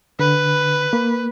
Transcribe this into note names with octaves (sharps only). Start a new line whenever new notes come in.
D3 B4
A#3